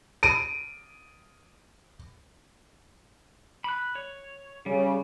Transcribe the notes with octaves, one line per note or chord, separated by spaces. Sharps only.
D7 D#7
B5 F#6
C#5
C#3 G3